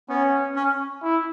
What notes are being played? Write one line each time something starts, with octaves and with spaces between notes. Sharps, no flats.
B3 C#4
C#4
E4